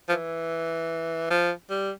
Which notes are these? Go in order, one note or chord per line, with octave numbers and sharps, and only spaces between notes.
F3
E3
F3
G3